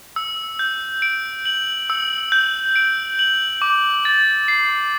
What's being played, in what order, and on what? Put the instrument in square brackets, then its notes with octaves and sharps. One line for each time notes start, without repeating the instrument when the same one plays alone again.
[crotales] E6
G6
D7
F#7
E6
G6
D7
F#7
D6
A6
C7